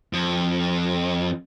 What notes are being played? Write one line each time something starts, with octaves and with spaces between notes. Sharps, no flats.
F2